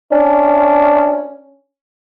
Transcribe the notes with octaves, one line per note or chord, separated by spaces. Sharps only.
C#4 D4